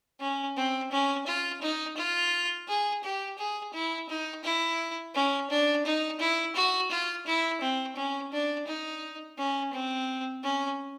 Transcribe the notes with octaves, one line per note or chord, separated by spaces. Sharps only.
C#4
C4
C#4
F4
D#4
F4
G#4
G4
G#4
E4
D#4
E4
C#4
D4
D#4
E4
F#4
F4
E4
C4
C#4
D4
D#4
C#4
C4
C#4